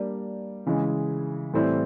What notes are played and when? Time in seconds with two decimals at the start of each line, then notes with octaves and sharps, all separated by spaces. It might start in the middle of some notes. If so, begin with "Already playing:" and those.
Already playing: G3 A#3 D4
0.66 C#3 E3 G#3
1.54 A2 E3 G3 C4 E4